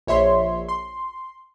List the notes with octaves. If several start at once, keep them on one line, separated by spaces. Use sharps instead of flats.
A#1 C#5 E5 C6
C6